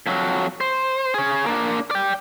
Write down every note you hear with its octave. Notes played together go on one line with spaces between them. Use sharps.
F2 F#3
C5
G#4 C#5
A#3 D4
D5 G5